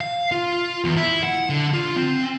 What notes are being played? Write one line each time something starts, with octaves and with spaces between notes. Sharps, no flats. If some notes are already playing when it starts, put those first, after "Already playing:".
F5
F4
E2
E4
F#5
D3
F4
C4